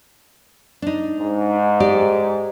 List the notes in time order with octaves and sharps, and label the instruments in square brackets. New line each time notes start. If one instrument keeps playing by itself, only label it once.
[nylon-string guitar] D4 D#4
[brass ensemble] G#2
[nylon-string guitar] G4 D5